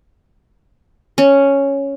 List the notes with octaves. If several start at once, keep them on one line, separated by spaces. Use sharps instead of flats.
C#4